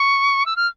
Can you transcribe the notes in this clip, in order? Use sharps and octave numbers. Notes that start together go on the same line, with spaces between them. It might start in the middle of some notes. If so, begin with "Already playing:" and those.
Already playing: C#6
E6
F6